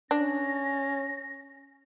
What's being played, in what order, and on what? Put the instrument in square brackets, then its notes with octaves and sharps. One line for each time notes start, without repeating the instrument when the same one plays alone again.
[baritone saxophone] C#4 [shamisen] D4 [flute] A#6